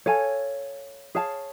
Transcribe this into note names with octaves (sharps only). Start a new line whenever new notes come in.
A4 C#5 F5 G#5
G#4 C#5 F5 A5